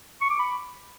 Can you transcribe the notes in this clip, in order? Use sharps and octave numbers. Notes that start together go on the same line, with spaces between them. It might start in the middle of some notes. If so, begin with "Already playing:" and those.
C#6
D6
B5